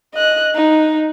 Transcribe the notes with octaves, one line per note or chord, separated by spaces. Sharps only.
D#5 F#6
D#4